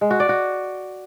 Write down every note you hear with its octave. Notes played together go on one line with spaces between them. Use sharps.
G#3
F#4
D5
F#4